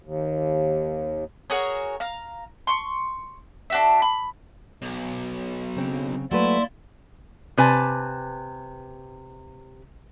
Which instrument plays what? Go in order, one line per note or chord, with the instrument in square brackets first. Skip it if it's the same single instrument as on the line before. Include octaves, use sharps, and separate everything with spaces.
[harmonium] D#2
[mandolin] F#4 G#4 A#4 C#5
F5 A#5
C6 C#6
D4 F#4 E5
B5
[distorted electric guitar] B1
[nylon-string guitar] C#3 F#3 C4
[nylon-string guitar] F#3 A3 B4 [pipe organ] A#3 D5 C6 [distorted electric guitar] E4
[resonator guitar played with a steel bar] C3 B4 G#5 A5